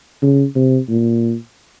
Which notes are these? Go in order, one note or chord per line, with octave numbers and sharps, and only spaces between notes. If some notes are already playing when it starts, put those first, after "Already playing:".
C#3
C3
A#2